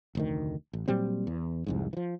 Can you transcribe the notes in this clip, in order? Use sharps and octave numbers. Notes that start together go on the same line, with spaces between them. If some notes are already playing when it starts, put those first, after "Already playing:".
F1 D2 D#3
A1
A#2 F#3 G3 C4
E2
C2 F2 G#2
E3 F3